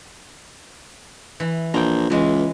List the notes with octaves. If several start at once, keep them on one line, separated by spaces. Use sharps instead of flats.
E3
A#1 G5 A#5
C#2 E3 G#3